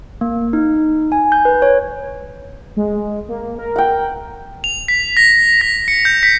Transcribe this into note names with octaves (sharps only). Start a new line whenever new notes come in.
A#3
D#4
G#5
G6
B4
C#5
G#3
A#3
A#4
F#5 G5
F7
B6
A#6
A#6
C#7
G6
B6